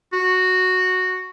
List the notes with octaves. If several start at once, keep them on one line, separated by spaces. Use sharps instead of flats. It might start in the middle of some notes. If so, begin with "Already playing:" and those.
F#4